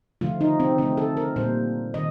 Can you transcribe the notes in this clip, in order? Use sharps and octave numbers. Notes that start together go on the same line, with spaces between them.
D3 F3 A3 F4
D#4
C4
D3 A3 C4
A4
A#4
A#2 G3 A#3 C5
D#3 D#5